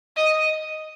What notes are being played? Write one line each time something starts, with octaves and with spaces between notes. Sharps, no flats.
D#5